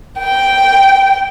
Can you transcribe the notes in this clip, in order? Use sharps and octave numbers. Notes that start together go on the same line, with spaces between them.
G5